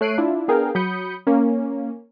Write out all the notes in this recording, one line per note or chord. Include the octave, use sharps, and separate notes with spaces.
A3 C#5 F#6 C7 D7 D#7
D4 E4 F4
B3 D4 G#4 A#4 F5 G5
F#3 B5 D#6 G6 C#7
A#3 C#4